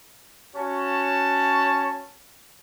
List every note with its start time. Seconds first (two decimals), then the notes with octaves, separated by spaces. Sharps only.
0.55 C#4 F#4 C#5 A5